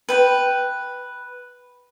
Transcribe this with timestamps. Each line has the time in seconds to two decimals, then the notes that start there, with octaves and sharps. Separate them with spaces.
0.09 B4 G5